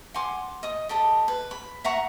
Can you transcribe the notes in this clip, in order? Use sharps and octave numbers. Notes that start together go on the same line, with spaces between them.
F#5 G#5 C6 D6
D#5 D#6
G4 A4 D#5 A5
B4
B5
E5 F#5 A#5 C#6